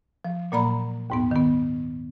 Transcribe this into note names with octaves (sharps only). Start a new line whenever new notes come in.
F3
A#2 F#3 A#3 D5 A#5 B5
D#2 G#2 B3
D#3 B3